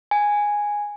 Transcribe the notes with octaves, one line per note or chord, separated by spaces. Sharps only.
G#5